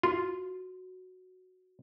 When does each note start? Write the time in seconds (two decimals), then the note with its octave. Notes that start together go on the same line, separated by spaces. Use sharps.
0.03 F4 F#4